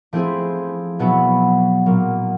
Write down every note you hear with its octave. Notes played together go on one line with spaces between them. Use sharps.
F3 A3 C4 E4 G#4
B2 F#3 B3 E4
A#2 F#3 A#3